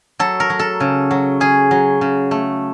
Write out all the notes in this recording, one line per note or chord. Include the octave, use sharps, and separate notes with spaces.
F#3 A4
A#4
F#3
A4
C#3
F#3
C#4 G#4
F#3
C#3
A3